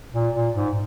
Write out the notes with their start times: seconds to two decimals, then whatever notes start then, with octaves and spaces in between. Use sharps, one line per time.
0.14 A#2
0.35 A#2
0.55 G#2